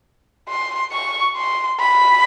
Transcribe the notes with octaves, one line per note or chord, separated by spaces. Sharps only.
C6
C#6
C6
B5